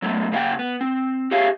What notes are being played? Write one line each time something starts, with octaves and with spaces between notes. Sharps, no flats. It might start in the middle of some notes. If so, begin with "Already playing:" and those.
F#3 A3 B3
C#3 A#3 C#5 D#5 F#5 G5
B3
C4
G4 G#4 C#5 E5 F5